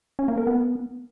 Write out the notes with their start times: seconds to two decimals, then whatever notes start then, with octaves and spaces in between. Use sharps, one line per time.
0.19 C#4
0.28 A#3
0.38 A#4
0.47 B3